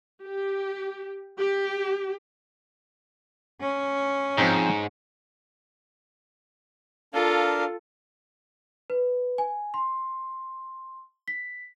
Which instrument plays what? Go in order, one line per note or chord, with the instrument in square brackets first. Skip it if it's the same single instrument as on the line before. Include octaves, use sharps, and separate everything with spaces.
[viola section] G4
G4
[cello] C#4
[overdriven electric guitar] G#2 [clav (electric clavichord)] F3 C4 D#4
[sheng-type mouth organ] D4 A#4 F5 [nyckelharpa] F4 A4
[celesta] B4
G#5
C6
B6